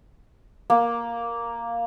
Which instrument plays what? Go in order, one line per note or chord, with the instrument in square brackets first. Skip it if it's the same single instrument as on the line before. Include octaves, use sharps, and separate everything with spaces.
[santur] A#3